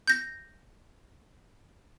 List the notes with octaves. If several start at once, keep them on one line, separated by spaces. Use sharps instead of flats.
G6 A#6